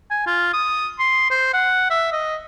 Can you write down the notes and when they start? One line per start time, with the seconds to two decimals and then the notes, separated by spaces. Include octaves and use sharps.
0.11 G#5
0.27 F4
0.53 D#6
0.99 C6
1.31 C5
1.53 F#5
1.90 E5
2.12 D#5